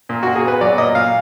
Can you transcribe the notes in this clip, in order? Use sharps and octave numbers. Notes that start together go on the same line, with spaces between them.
A#2
F#4
A#2
G#4
B3 B4
F#3 D5
A#2 D#5
A#2 F5